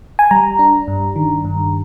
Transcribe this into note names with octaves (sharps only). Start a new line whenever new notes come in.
G#5
G3 A#5
D4
G2
D#3
G2